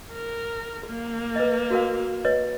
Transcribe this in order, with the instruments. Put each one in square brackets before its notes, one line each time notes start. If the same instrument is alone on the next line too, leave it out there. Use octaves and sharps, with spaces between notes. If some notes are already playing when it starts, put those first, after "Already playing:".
[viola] A#4
A#3
[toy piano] B4 D#5
F#4 A#4 F5
B4 C#5 D#5